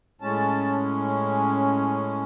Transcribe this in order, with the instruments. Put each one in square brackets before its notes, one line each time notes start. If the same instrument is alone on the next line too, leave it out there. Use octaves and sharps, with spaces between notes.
[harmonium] A2 G#3 C#4 A5